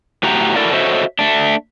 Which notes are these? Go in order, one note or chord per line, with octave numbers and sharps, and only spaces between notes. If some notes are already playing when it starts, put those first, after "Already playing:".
A2 F#4 G4 A#5
D4 E4 F#4 A4 A#4 D5
F#4 A4 C5 C#5 D#5 E5
A3 D4